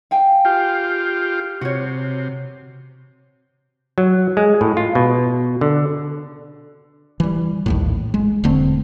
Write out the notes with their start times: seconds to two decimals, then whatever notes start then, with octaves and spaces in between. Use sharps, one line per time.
0.11 F5 G5 G#5
0.45 F4 G4
1.61 C3 F#4 C#5
3.98 F#3
4.37 G#3
4.61 A2
4.77 F4
4.95 B2
5.61 D3
7.20 E3 G3
7.66 A#1 D#2 A2
8.14 G#3
8.44 E1 D3 A3 C4